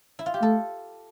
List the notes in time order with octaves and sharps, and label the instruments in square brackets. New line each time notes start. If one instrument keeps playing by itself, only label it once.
[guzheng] E4
F4
G4
[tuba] A3 [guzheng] A4